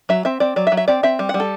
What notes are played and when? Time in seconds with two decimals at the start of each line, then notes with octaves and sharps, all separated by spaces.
0.09 F#3 E5
0.25 C4 E5
0.40 C4 D5
0.56 F#3 D5
0.67 E5
0.72 F#3
0.77 E5
0.88 C4 D5
1.03 C4 E5
1.19 G3
1.29 F#5
1.34 G3
1.40 A4